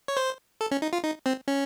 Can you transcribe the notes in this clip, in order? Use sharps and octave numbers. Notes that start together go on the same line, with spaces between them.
C#5
C5
A4
C#4
D#4
F4
D#4
C4
C#4